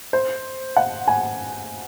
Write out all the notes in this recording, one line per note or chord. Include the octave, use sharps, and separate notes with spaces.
C5
F#5
G#5